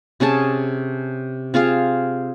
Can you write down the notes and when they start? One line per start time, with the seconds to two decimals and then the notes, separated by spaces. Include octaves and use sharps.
0.20 C3 C#4 G#4 A5
1.54 C4 F4 G#4 F5